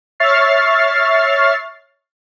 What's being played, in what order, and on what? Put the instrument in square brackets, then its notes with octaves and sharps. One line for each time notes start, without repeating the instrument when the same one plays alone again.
[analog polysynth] C#5 E5 C#6 F6 A6 C7